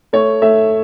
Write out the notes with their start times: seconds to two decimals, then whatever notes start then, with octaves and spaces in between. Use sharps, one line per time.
0.13 A3 C#5
0.42 A3 E5